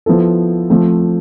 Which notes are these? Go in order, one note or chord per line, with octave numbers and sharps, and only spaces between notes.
F3 B3 E4 A4
F3 A3 C4